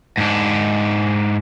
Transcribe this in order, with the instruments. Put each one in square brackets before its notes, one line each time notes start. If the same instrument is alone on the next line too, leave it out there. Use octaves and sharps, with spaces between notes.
[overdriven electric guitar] G#2 D4